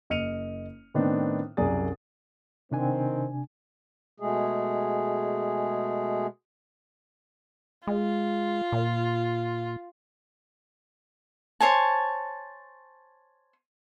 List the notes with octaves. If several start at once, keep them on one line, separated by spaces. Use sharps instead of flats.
F#1 D#5 F6 C#7 D#7 F7
A2 D#3 B3 C4 D4 D#4
C2 F#2 G#4 D5 D#6 A6
C3 D#3 C4 D4 G#5
B2 G#3 A3 G#4
G#3 F4
A#2
C5 C#5 G#5 A5